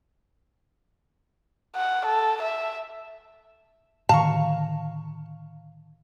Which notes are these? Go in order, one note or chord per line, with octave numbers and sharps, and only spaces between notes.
F#5
A4
E5
A2 D3 D#3 F5 A5 A#5 C#6